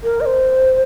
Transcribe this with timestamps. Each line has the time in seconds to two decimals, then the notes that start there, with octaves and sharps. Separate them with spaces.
0.03 A#4
0.21 D#5
0.26 C5